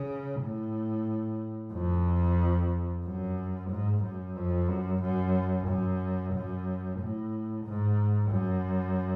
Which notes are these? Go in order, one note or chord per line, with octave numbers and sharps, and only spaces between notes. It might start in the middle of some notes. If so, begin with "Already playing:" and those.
Already playing: C#3
A2
F2
F#2
G#2
F#2
F2
F#2
F#2
F#2
F#2
A2
G#2
F#2